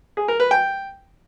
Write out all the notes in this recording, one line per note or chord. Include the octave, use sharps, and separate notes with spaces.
G#4
A#4
B4
G5